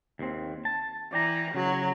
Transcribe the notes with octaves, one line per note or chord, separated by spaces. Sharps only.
D#2 C4
A5
E3 D5 G5 A#5
C#3 F#3